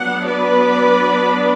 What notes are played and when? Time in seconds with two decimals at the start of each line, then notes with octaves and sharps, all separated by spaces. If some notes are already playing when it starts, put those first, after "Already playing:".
Already playing: F#3 B3 D4 F#5
0.27 B4 D5